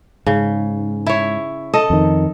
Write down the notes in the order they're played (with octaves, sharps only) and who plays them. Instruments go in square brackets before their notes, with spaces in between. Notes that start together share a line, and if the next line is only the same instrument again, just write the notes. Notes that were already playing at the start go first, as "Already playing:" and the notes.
[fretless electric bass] G#2 [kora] C#3
[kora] E4 C#5
A4 D#5
[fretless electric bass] F2 D#3